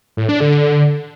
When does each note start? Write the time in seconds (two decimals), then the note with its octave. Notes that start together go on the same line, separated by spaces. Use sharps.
0.17 A2
0.29 D4
0.40 D3